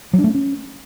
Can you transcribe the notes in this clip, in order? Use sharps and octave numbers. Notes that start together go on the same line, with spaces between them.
F#3
D4
A3
C4
C#4